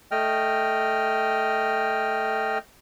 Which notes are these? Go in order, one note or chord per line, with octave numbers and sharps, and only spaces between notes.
A3 D#5 G5 F6